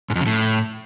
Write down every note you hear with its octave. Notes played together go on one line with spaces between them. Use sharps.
G#2
F2
C#3
A2